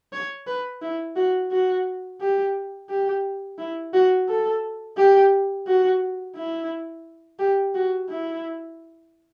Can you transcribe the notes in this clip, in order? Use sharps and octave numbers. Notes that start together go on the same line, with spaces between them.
C#5
B4
E4
F#4
F#4
G4
G4
E4
F#4
A4
G4
F#4
E4
G4
F#4
E4